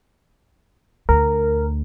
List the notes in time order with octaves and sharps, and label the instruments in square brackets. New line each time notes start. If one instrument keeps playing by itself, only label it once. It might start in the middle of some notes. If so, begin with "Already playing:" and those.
[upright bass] D2 [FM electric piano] A#4